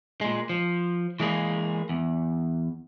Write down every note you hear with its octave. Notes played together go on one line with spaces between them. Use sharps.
A#2 G#3
F3
E3 G#3 A#3 G#4
E2